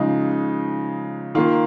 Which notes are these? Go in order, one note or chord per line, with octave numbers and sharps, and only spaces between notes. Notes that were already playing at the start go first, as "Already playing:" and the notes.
Already playing: C#3 F3 G#3 D#4
D#3 A#3 F4